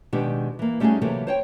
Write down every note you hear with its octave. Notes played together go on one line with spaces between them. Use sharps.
B2 D#3 G#3 D4 G4
E3 A#3
G3 A3 C#4 D#4 F#4 G#4
C3 E3 F#3 A#3 G4 A4
C5 C#5 G5